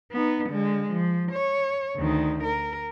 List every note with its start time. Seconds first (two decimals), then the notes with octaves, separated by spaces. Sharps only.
0.12 B3 D#4
0.49 D3 G#3
0.90 F3
1.32 C#5
1.98 D2 D#3
2.44 A#4